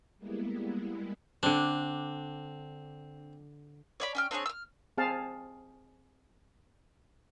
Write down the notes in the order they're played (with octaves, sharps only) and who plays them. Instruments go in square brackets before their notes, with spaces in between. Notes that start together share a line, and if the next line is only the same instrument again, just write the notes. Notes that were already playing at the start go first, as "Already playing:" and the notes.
[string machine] G3 G#3 A#3 B3 E4
[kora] D3 D4 [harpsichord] C4
[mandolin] C#5 D5 B5
C#4 G5 F6
C4 D4 G#4 C#5
E6 F6
[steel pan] C4 G#4 F5 A5